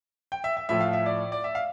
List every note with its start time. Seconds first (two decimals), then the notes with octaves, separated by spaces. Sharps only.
0.32 G5
0.44 E5
0.57 E5
0.69 A2 F3 A3 E5
0.80 F5
0.93 E5
1.06 D5
1.32 D5
1.44 E5
1.55 F5